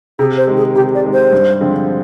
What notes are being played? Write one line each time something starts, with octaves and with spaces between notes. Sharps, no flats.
C3 G#4
C5
D#3 G#3
G#4
C3 G4
D5
D#3 G#3
C5
G2
D3 F3 G#3 C4